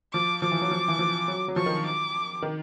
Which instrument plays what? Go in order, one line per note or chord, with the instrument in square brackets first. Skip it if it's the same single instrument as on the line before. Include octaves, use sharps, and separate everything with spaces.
[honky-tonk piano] F3 [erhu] D6
[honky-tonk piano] F3 [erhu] D6
[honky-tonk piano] E3
F#3
F3
E3
F3
F#3
F#3
[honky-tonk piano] F3 [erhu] C#6
[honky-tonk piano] D#3
[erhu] D6
[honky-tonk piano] D#3